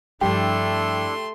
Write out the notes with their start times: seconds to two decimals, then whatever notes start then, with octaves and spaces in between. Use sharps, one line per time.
0.21 G2 F3 A3 D4 E4 G4 A4 C6